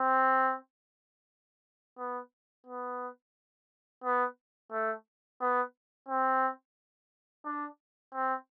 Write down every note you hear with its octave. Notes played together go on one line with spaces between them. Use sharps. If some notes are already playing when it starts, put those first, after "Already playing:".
Already playing: C4
B3
B3
B3
A3
B3
C4
D4
C4